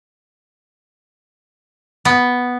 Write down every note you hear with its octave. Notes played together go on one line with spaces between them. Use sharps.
B3